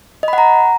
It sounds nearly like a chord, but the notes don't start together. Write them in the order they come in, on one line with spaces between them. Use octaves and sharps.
D#5 B5 F#5 A#5